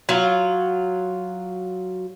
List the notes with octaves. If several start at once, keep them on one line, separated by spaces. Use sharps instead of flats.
F#3 F4